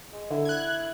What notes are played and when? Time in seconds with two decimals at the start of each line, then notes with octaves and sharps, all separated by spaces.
0.12 G#3
0.31 D3 E4
0.45 F#6 G#6